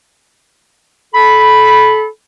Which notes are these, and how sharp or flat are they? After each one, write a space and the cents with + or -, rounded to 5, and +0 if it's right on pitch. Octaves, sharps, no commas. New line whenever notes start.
A4 -30 B5 +0